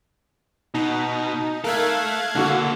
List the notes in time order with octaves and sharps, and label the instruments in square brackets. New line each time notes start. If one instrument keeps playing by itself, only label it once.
[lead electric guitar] B2 [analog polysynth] D#4
[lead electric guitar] A3 A4 [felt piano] A#4 [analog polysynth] F5 F#6 G#6
[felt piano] D3 F#4 [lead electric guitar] A#3 A4